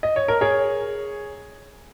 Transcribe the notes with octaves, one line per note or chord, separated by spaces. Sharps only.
D#5
C#5
A#4
G#4 C#5